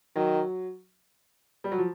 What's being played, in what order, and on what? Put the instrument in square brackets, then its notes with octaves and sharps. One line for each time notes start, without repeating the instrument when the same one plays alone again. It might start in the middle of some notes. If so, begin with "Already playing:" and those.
[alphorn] D#3 [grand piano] F#3
[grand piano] G3
F#3
F3